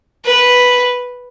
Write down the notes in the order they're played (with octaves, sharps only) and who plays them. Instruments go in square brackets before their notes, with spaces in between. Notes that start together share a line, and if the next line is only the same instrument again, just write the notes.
[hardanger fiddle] B4